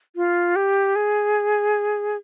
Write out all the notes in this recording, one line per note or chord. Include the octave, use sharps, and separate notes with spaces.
F4
G4
G#4